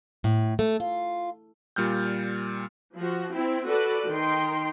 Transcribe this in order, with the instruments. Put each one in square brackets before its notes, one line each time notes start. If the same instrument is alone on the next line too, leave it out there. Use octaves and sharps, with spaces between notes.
[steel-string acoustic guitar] A2
A3
F4
[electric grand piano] A#2 G3 F6 G6
[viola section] F3 F#4
C4 E4
F#4 A4 B4 D5
D#3 D#4 G5 C6